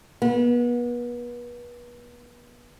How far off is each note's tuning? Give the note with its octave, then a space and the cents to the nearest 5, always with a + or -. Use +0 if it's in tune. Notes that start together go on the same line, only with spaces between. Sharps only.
B3 -35